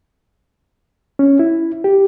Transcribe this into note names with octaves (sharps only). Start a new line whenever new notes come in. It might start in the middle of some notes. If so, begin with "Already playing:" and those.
C#4
E4
G4